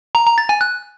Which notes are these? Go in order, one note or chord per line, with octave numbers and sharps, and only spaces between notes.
A#5
A#5
A6
G#5
F#6